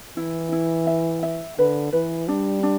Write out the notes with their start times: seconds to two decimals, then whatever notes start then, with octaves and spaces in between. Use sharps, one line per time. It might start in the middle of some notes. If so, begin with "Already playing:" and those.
0.17 E3 E4
0.52 E4
0.87 E5
1.23 E5
1.58 D3 B4
1.92 E3 B4
2.28 G3 D4
2.63 D4